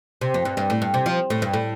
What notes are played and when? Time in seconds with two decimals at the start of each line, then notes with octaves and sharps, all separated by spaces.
0.21 C3
0.34 F2
0.45 G2
0.57 G2
0.70 A2
0.82 G2
0.94 C3
1.06 F3
1.30 A2
1.42 G2
1.54 A2